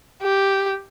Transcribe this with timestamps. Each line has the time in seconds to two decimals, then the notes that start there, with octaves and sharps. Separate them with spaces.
0.22 G4